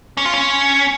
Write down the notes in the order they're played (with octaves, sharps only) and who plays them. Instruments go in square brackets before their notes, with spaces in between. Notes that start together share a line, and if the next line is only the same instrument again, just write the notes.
[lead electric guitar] C#4
F4
C#4